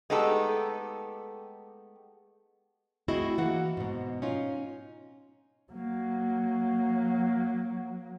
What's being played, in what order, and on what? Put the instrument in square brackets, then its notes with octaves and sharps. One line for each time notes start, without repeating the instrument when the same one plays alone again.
[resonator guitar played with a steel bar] G#3 A3 B3 D#4 G4 A4
[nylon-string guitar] A3 C4 E4 F#4 G#4 D#5
E3 A#3 F#4 F#5
G#2 B2
C#4 D#4 F4
[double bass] F#3 A#3